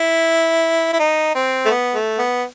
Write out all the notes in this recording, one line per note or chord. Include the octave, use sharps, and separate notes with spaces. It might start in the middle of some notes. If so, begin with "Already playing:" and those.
Already playing: E4
E4
D#4
C4
A3
B3
A3
B3